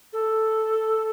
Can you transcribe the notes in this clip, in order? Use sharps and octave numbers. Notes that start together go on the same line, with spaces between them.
A4